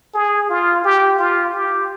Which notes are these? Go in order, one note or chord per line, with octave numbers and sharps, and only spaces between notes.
G#4
F4
G4
F4
G4